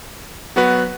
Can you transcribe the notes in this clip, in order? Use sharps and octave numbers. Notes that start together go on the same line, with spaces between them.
F#3 B3 F#4 B4